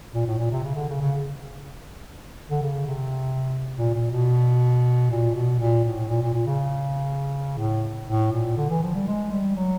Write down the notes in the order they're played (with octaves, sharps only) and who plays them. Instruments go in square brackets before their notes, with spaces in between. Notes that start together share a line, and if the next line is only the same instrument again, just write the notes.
[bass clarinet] A#2
A2
A#2
C3
C#3
D3
C#3
C#3
D3
C#3
C3
A#2
A#2
B2
A#2
B2
A#2
A2
A#2
A#2
A#2
C#3
A2
A2
A#2
D3
E3
F3
G3
G#3
G3
F#3